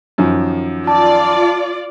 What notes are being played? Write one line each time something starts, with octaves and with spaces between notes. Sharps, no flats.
F#2 D#3 F3
F4 D5 A5